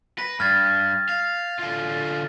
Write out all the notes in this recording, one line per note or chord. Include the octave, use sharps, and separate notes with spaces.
B4 A#6
G2 F6 G#6 A6
F5
D3 F4